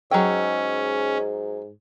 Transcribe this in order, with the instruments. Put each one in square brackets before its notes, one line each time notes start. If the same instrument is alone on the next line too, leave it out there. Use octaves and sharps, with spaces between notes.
[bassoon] G#2 [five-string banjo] F#3 G5 [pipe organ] C#4 [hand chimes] G#4 D#5 E6